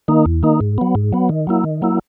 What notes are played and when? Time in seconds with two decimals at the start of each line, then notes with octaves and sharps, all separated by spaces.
0.08 D#3 A#3 D#4
0.26 E2
0.43 D#3 A#3 D#4
0.61 G#2
0.78 F#3 B3
0.95 G#2
1.13 F#3 B3
1.29 D#3
1.47 F#3 A#3 E4
1.64 D#3
1.82 F#3 A#3 E4